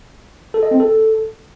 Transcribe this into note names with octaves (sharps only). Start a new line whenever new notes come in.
A4
D#5
C4
A4